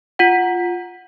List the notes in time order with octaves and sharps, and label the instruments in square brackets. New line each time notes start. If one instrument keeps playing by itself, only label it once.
[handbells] F4 F#5